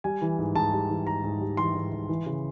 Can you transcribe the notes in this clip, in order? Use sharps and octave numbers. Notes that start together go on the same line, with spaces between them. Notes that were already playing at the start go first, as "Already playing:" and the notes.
G3 G#5
E3
G#2
G#2 A5
G3
E3
G#2 A#5
G#2
G3
E3 C6
G#2
G#2
E3
C#3